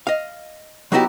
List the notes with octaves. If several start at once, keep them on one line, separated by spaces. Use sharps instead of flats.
D#5 F5
F#3 B3 D#4 E4 F#4 G4